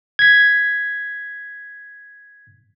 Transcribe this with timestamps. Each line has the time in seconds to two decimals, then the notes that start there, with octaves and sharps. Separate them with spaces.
0.19 G#6 B6